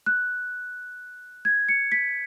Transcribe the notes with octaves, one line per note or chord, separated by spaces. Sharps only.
F#6
G#6
C#7
B6